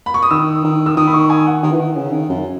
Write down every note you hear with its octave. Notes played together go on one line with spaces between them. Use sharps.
B5
C#6
D#6
D#3 E6
D#3
E6
D#3 D#6
B5
C#6
G#5
F#5
D#3
E3
D#3
C#3
D#3
F#2